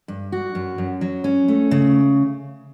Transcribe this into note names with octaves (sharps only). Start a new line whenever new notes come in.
G2
F#4
F#2
F#2
F#3
C#4
A3
C#3